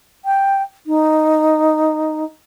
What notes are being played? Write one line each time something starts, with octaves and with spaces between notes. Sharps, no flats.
G5
D#4